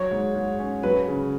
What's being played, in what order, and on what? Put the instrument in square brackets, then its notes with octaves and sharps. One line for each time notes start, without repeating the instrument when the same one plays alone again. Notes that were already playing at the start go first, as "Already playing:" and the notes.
Already playing: [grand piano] F#3 [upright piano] C#5
[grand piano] G#2
G#2
C#4
[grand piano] F#3 [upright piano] B4
[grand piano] C#3